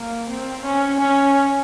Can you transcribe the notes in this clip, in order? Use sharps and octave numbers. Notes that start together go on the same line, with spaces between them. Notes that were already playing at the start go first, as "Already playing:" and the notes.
Already playing: A#3
C4
C#4
C#4